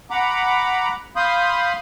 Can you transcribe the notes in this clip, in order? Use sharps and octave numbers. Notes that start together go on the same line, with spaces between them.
F#5 A#5 B5 D6
F5 B5 C6 D#6 G6